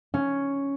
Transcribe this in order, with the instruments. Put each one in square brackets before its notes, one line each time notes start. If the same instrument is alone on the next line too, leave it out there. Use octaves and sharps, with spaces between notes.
[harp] C#4